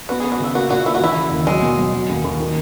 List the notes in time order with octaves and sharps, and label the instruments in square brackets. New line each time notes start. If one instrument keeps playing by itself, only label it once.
[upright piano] B3 [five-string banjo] F#4
[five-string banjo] G#4
[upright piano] B3
[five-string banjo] F#4
[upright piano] C#3 [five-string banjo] E4
[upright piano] A#3 [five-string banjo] F#4
[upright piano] A#2 [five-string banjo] F#4
[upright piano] A#3 [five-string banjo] E4
[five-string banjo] F#4
[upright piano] E3 [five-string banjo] E4
[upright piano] C#3
D#2
[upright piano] F#3 [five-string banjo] G#3
[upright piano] B2
F#3
F#3
D#2
D#2
D#3